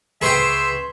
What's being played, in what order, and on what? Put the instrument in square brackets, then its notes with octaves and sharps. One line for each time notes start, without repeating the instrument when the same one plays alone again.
[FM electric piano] C#2 B4 C#6 [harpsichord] G#4 C5 G5 [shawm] E5 [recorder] C6